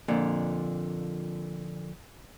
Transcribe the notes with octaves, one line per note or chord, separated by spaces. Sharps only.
F2 A#2 D3